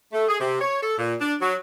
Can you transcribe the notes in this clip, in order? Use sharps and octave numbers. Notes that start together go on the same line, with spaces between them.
A3
G#4
C3
C#5
A4
A#2
D4
F#3